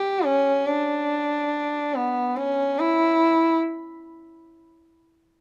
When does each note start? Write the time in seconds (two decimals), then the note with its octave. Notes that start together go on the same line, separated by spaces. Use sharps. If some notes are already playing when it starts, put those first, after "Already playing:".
Already playing: G4
0.24 C#4
0.67 D4
1.95 B3
2.36 C#4
2.79 E4